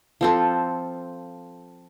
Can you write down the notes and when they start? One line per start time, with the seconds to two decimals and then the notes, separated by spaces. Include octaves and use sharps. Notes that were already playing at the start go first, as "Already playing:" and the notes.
0.21 F3 C4 A4